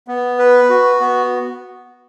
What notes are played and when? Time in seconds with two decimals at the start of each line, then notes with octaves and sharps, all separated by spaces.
0.08 B3
0.39 B4
0.69 F#4
1.00 B3